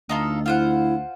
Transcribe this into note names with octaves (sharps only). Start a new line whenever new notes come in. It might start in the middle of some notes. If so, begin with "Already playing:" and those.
D2 D#4 F4 A4
E4 F4 C5 F#5